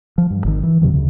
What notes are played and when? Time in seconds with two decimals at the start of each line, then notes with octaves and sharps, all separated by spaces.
0.18 F3
0.30 G2
0.44 G#1 D#3
0.63 E3
0.82 F2 C3 D#3 F#3
0.93 D2 C#3